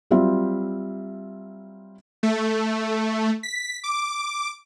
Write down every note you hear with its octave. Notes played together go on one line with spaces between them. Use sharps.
F#3 G3 C4 F4 E5
A3
B6
D6